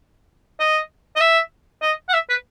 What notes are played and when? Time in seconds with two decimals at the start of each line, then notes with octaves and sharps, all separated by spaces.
0.60 D#5
1.16 D#5
1.21 E5
1.82 D#5
2.09 F#5
2.14 E5
2.29 B4